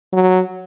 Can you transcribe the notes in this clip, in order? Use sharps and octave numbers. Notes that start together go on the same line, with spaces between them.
F#3